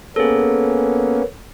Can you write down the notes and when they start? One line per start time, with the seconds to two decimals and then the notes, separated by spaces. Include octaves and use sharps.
0.16 A#3 B3 C#4 G#4 A4